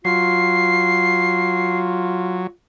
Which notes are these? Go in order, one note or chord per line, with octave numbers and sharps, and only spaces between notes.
F#3 F4 C7